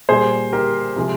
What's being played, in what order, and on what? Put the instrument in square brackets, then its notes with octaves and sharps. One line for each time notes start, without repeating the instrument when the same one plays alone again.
[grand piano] A#2 G3 G#4 C5
G4 A#4
C3 F3 G#3